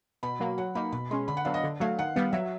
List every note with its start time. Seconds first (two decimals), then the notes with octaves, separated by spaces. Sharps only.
0.23 B2 B5
0.40 F#3 A#3
0.58 F#3 F#5
0.75 A#3 D#4 B5
0.92 B2 B5
1.11 G#3 C#4 C6
1.28 D3 B5
1.37 F#5
1.45 F#3 B3 D4 F5
1.54 D#5
1.64 D3
1.80 F#3 A3 F5
1.99 D#3 F#5
2.16 G3 B3 F5
2.32 F#3 E5